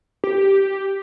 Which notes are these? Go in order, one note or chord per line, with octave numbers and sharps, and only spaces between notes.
G4